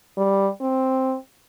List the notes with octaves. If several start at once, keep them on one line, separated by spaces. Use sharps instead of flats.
G3
C4